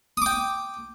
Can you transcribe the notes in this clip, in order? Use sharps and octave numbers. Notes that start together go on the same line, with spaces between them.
G5 D6 D#6